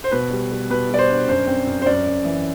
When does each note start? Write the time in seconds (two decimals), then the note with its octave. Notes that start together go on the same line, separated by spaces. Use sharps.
0.04 C5
0.11 B2 B4
0.31 G3
0.51 G3
0.70 B2 B4
0.89 G3 D5
0.99 C5
1.09 D4
1.28 F#2 C5
1.47 C4
1.67 F#2
1.82 C5
1.86 F#2 D5
2.07 F#2
2.25 E3